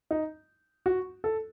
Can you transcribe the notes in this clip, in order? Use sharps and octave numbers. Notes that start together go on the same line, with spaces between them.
D#4
F#4
A4